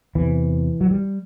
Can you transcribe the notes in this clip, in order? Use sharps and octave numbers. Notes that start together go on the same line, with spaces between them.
E2 C3 E3
F#3
G3